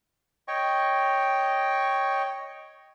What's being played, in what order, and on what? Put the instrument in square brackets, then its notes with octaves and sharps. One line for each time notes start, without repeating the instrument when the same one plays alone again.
[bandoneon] C#5 D#5 G5 C#6